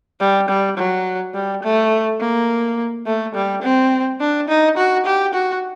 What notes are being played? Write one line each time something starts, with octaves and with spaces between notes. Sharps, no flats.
G3
G3
F#3
G3
A3
A#3
A3
G3
C4
D4
D#4
F#4
G4
F#4